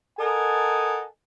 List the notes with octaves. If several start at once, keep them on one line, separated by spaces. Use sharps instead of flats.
A4 A#4 D#5 F#5 G#5 A5